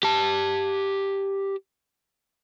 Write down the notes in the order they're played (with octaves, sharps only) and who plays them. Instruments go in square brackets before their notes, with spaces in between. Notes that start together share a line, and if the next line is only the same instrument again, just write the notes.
[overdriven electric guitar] G4 A5